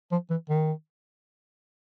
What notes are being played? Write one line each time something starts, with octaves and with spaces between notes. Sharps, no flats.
F3
E3
D#3